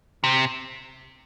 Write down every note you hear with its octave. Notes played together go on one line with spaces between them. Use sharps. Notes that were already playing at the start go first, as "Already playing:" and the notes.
C3